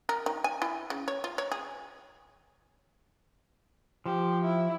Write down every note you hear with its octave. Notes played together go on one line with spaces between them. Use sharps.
A#4
D#3
G#5
E4
C#3
C#5
F4
C#5
G#4
F3 G4
E4